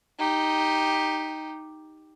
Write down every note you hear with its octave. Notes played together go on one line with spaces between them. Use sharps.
D#4 G4